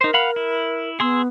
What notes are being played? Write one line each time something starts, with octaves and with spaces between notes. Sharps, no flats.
D#4 A#4 C5
F5 F#5 B5
E4
B3 G#4 C6 E6